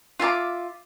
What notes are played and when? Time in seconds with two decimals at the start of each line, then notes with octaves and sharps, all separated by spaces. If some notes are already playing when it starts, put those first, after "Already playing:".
0.19 F4 E5 A5 D6